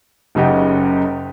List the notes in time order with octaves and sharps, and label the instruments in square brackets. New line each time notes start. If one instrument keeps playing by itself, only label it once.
[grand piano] F#1 F#2 C#3 D#4 G4 F#5